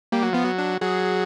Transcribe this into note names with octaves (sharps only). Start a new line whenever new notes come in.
G3 A#3
F#3
F3 B3
F#3
D4
F#3 G#4